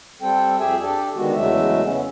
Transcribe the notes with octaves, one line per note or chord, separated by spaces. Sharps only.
G3 C4 A4 G5
F2 G4 G#4 E5 G#5
D4 G4 A4 D5
D3 D#3 G#3 B3 F#4
E2 C#3 F#3 G#3 A3 E5
C#3 B3 C#4